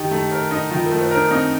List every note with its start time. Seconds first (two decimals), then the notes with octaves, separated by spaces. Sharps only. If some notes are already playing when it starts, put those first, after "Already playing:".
Already playing: D#3 D#4 G4
0.11 A3
0.31 A#4
0.51 D#4
0.71 D#3 F4
0.86 A#4
0.91 A3
1.01 C5
1.11 A#4
1.16 D4
1.31 C4 D#4